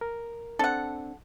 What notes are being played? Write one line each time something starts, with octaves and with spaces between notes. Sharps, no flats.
A#4
C4 D4 A4 F#5